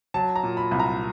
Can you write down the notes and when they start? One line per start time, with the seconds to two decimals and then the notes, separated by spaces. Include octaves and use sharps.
0.14 F#3 A5
0.35 A#5
0.43 A#2
0.57 B5
0.71 C2 B5
0.79 A#5